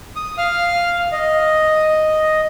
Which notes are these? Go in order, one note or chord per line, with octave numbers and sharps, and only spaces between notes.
D#6
F5 F6
D#5